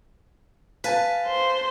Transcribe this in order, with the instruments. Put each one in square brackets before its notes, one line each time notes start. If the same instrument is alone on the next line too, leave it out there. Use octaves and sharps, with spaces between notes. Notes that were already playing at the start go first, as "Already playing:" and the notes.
[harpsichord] B4 G#5 A5 [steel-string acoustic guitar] F5
[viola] C5